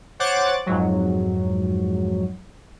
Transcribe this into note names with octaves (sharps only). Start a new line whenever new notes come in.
C5 C#5 F#5 D6 F#6 A6
F2 G#2 F#3